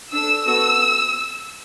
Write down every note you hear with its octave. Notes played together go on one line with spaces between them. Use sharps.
D4 A4 E6
B3 F#4 A4 E6